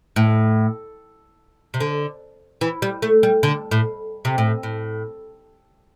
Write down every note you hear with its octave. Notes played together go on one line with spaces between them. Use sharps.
A2
C3
D3
E3
G3
A3
G3
D3
A2
C3
A2
A2